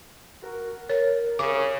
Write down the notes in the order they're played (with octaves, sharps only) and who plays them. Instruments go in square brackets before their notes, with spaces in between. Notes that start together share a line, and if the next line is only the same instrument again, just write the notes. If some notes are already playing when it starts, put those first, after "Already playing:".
[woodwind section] F#4 A#4
[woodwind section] A#4 [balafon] C#5
[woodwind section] C2 [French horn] C#3 [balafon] D6